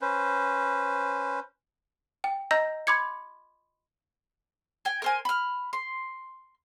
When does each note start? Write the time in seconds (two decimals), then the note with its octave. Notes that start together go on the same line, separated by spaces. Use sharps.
0.01 C#4 B4 C5
2.24 G5
2.51 D#5 A#5 E6 G6 A#6
2.87 B5 C6 D6 G#6 C#7
4.85 G5 G#5
5.02 A#4 C5 G#5
5.25 B5 F6
5.73 C6